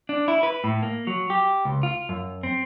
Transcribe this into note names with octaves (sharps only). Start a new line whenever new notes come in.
D4
E4
B4
A2
A#3
F#3
G4
C#2
F4
F#2
C4